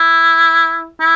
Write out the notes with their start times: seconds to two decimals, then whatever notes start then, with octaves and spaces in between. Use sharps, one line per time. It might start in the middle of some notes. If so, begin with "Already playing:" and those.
Already playing: E4
1.00 E4